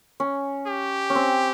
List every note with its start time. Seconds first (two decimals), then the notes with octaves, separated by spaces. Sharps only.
0.20 C#4
0.67 G4
1.10 C#4
1.15 C4